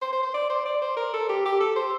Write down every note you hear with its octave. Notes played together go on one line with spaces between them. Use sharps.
C5
C5
C5
D5
C5
D5
C5
A#4
A4
G4
G4
A4
C5